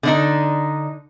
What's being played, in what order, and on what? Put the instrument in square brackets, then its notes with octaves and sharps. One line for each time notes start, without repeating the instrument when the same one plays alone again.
[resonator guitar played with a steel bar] D3 D4 D#4